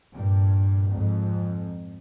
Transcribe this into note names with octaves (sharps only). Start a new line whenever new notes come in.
G2 A#2
F2 G#2